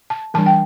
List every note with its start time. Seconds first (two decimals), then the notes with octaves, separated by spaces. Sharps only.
0.10 A5
0.34 E3 G3 D4 A5
0.46 G5